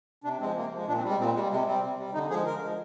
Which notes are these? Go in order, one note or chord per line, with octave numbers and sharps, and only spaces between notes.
C3 D4
F3 G#3 C4
C3 A#3
F3 G#3
A#2 D4
C4
G3
G#3
A#2 C4
G3 G#3
C3 G#3
G3 C4
C3
G3
D3 D#4
F3 G#3 G#4
D3 A#4
F3 G#3